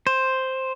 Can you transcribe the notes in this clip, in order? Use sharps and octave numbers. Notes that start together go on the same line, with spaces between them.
C5